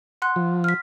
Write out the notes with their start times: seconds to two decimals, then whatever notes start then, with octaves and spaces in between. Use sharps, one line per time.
0.22 F#5 C6 F#6
0.36 F3
0.64 F6 B6